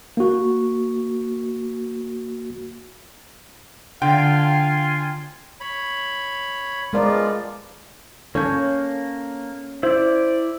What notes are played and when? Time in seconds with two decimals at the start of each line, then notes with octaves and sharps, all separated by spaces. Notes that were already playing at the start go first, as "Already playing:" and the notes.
0.17 A#3 F#4
4.02 D3 F4 F5 G5 G#5 C6
5.60 C#5 B5
6.93 F3 G#3 B3 F4 A#4 D5
8.35 A#3 C#4 A4 C#5 G6
9.83 E4 C5 D5